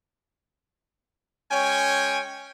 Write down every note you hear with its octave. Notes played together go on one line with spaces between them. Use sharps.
G#3 C#4 C#5 G5 G#5